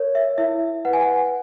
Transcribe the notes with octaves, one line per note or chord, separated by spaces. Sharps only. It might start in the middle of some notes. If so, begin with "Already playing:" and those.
Already playing: A#4 C#5
E5
E4 E5
B4 F#5
G#5
F#5